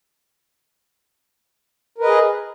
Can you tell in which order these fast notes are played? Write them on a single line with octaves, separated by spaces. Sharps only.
A#4 B4 D#5 G#4